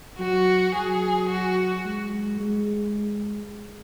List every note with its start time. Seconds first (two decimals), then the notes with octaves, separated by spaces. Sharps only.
0.19 F#3 F#4
0.75 F#3 G#4
1.29 F#4
1.85 G#3
2.40 G#3